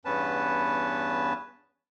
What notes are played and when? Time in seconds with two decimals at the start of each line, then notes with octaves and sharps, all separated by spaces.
0.05 E2 G2 B3 C#4 B4 A5